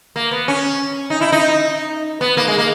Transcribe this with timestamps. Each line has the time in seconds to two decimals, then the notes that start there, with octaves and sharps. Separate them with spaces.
0.16 A#3
0.31 B3
0.48 C#4
1.10 D#4
1.21 E4
1.32 D#4
2.21 B3
2.37 A#3
2.48 G#3
2.58 A#3